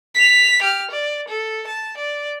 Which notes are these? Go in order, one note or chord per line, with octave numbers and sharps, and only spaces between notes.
B6 F7
G4 F6
D5
A4
A5
D5